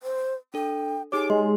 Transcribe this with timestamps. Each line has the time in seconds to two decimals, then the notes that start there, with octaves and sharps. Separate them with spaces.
0.03 C5
0.54 D4 A4 G5
1.12 D#4 G4 G#4 C#5 D6
1.30 G#3 C6